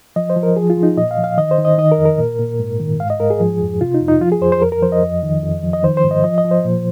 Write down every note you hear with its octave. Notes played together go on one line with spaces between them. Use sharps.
F3 D#5
C5
F3
A#4
F3 G#4
F4
F3
D#4
A#2 D#5
F5
F3
F5
D#3 D#5
C5
D#3
D#5
D#3 D#5
A#4
F2
A#4
A#2
A#2
G#2
D#3
G#2 F5
D#5
G#2 A#4
G#4
F3
F2
C3 F4
D#4
F2
D#4
F3 F4
G#4
F2 C5
C5
F2 A#4
A#4
F3 C5
D#5
F2
D#3
F2
F3
D#5
D#3 C5
C5
G#2
D#5
F3 D#5
D#5
F3
C5
A#2